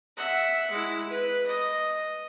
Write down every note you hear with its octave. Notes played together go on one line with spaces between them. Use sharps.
E5 F#5
G#3 E4
B4
D#5